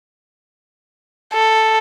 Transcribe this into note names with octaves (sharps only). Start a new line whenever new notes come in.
A4